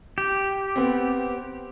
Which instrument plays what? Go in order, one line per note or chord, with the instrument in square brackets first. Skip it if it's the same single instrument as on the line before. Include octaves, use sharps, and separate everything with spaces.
[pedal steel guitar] G4
[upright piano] B3 C4